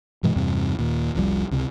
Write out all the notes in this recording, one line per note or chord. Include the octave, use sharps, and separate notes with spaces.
G2 B2 E3 G#3
E2 G2 C3
D#2 A#2
F1 C2 F3 G3
C#2 C3